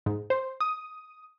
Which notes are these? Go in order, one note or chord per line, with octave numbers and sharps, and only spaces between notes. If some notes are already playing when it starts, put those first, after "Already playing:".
G#2
C5
D#6